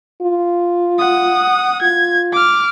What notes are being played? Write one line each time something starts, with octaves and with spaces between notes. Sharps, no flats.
F4
F#5 D#6
F4 G#6
D6 F6